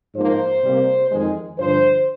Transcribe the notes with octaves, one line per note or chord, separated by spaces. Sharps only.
G#2 F3 A#3 C5
C3 G3 A#3
F2 D#3 G#3
G2 D3 F3 C5